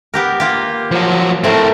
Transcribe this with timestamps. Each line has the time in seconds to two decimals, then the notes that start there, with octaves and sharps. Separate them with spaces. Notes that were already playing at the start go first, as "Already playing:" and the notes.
0.14 B3 G4 A#4
0.40 A#3 F4 G4
0.91 F3 F#3
1.44 A2 A3 C4 A#4